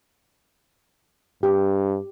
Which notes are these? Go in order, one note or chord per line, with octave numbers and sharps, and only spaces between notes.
G2 G4